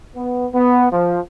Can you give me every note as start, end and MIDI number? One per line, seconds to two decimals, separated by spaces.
0.15 0.45 59
0.53 0.85 59
0.92 1.18 53